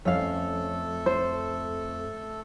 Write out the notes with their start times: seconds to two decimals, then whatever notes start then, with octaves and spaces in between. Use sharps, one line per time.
0.05 F2 A3 C#4 A4 F5
1.06 C5